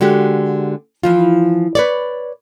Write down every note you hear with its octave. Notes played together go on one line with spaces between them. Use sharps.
D3 G#3 F#4 G4
E3 F3 F4
B4 C#5 D5